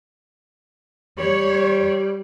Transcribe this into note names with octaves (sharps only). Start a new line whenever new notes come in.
G3 C#5